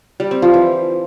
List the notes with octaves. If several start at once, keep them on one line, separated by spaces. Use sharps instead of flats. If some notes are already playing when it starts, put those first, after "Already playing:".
G3
C4
F3
E3